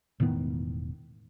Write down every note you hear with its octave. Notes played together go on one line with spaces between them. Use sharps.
E1 A2 D#3 B3